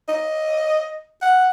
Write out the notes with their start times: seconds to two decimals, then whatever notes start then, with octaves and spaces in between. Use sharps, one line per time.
0.09 D#5
1.22 F#5